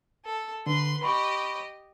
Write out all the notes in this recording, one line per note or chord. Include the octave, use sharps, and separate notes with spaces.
A4
D3 B4 C6
G4 D#5 B5 C#6